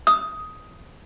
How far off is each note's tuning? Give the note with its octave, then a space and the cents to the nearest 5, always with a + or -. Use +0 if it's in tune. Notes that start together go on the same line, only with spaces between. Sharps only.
D#6 +10